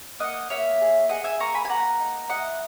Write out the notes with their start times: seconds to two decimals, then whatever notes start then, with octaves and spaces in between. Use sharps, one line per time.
0.19 A#3 D#5 F#5
0.50 A#3 C#5 E5
0.81 G#4
1.09 G#4 D#5 F#5
1.24 E5 G#5
1.39 A#3 A#5 C#6
1.54 G#5 B5
1.65 G#5
1.69 A#3 F#5 A#5
2.00 D#4
2.29 E4 D#5 F#5